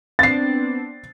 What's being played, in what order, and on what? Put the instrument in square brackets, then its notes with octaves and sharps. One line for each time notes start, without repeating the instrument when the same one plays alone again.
[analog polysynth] B3 C4 D4 [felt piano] A6 C7